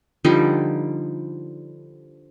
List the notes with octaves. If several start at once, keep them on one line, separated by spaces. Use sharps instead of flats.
D3 F3 G3 D#4